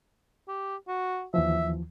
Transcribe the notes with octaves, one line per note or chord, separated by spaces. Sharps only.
G4
F#4
D#2 E3 F3 E5